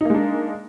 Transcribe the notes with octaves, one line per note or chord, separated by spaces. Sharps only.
G#3 A#3 D4 D#4